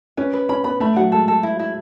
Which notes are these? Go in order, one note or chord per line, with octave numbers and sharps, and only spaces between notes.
C#4 B4
B4
C#4 B5
B3 B5
A3 B5
F#3 F#5
G#3 A4
A4
E4
E4